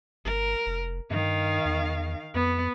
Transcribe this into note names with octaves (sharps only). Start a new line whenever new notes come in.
G1 A#4
F1
G2 D#3 F5
E2
F2 B3